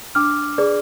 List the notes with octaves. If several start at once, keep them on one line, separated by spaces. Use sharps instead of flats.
D4 D6 F6
G#4 B4 D5